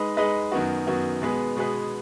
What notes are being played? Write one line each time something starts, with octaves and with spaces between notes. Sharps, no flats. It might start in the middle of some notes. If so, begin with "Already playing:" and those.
Already playing: G#3 D#4 B4 D#5
G#3 D#4 B4 D#5
F#2 D#3 B3 F#4
F#2 D#3 B3 F#4
B2 G#3 B3 G#4 B4
B2 G#3 B3 G#4 B4